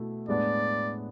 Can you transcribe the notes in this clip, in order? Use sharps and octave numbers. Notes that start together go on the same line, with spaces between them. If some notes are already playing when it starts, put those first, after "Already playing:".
Already playing: B2 A3 E4
A2 G#3 B3 D4 D5